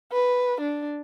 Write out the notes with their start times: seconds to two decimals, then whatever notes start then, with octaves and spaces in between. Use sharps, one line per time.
0.13 B4
0.61 D4